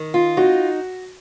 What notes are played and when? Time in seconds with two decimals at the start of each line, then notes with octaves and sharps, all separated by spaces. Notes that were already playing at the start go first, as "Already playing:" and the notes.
Already playing: D#3
0.14 F4
0.37 D#4 F#4